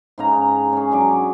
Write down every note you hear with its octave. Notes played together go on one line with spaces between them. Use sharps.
G#2 C#3 A#5
C#4 G#4
F#3 D4 D6